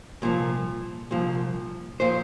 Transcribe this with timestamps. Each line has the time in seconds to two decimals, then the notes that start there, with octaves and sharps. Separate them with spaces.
0.22 C2 A#2 F3
1.11 C2 A#2 F3
2.00 A#2 F3 C5